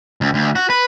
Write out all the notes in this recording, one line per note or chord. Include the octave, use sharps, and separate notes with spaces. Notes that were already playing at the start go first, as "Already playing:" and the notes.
C#2
D2
F#4
B4